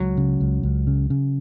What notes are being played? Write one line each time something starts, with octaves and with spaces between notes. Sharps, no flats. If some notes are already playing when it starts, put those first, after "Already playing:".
Already playing: C#2 F#3
C#3
C#2
C#2
C#3
C#3